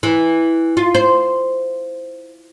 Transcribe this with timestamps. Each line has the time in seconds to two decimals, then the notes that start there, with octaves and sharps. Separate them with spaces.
0.03 E3
0.77 F4
0.95 C5